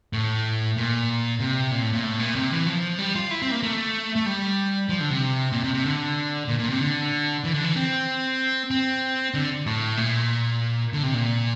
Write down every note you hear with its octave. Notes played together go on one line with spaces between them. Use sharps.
A2
A#2
C3
A#2
A2
A#2
A2
A#2
C3
E3
F3
G3
F4
E4
C4
A#3
A3
A3
G3
F3
D3
C3
A#2
C3
C3
D3
A#2
A#2
C3
D3
E3
D3
E3
C4
C4
D3
A2
A#2
D3
C3
A#2